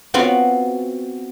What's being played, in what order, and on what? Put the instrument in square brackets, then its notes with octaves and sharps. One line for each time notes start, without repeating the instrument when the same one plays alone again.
[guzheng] B3 C4 F4 F#4